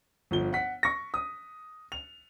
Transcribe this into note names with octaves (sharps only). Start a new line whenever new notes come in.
G1 F3 G7
F#5 B6
C#6 A#6
D#6
F7